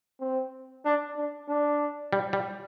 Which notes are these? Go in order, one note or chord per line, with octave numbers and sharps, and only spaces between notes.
C4
D4
D4
D4
G3
G3